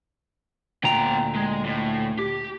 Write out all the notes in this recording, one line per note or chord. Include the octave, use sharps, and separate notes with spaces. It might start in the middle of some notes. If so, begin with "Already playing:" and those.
D2 A#2 B3 G5 A#5
G#3
A2
G4